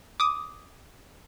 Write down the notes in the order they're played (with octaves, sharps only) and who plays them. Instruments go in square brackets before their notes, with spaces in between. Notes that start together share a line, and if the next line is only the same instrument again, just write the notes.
[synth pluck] D6 D#6